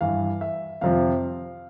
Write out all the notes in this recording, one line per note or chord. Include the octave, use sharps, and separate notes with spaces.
G2 E3 F5
E5
F2 C3 F3 F5